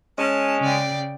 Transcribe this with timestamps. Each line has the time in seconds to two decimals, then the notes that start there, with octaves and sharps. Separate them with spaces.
0.18 G#3 C#4 A5
0.60 C#3 D5 G5